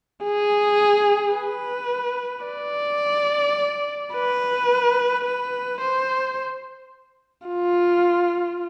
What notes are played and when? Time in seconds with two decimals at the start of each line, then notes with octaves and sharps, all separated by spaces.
0.24 G#4
1.35 B4
2.46 D5
4.14 B4
5.25 B4
5.81 C5
7.48 F4